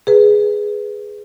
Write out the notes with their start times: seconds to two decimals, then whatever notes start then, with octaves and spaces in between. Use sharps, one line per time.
0.07 G#4 B4